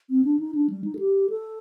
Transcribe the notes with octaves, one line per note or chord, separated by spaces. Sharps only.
C4
D4
D#4
D4
G3
D#4
A4
G4
A4